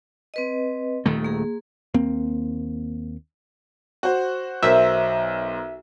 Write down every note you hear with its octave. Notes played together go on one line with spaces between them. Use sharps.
C4 B4 D#5
D#1 D#3 A3
A#3 G#4
D#2 A#3 C4
F#4 C5
B1 A#4 C5 E5